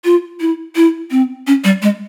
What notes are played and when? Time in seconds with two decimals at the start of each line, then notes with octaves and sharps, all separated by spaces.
0.05 F4
0.40 E4
0.76 E4
1.11 C4
1.47 C#4
1.64 G3
1.82 G#3